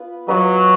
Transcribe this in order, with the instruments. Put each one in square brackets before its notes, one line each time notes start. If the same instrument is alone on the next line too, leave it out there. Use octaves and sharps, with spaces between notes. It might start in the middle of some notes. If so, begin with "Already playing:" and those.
Already playing: [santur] B3 F4 B4
[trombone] F#3 [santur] B3 F4 B4 D#5